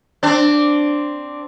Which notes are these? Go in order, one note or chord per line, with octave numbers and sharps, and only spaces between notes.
C4 D4